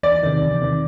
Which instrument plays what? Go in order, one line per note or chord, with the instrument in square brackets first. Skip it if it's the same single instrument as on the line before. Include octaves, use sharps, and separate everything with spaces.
[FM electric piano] E2 [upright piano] D5
[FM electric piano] C3 D#3
E2
C3 D#3